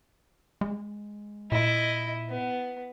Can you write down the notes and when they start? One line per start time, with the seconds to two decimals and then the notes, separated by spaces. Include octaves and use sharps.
0.61 G#3
1.52 A#2 E4 D#5
2.29 B3